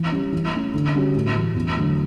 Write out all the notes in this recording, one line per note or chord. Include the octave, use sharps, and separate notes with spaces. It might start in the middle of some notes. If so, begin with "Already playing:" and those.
Already playing: E3
G3 C#4
E3
A3 C#4
D3
G3 C#4 F#4
A2
E3 G3
E2
D3 F#3 A3